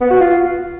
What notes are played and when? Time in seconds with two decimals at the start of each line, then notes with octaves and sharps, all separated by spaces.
0.01 B3
0.11 F#4
0.20 F4